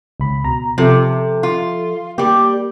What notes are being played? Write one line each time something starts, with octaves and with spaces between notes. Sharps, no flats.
C#2 B5
B2 A#5
C3 F3 A4 E5
F4
G3 A#3 G4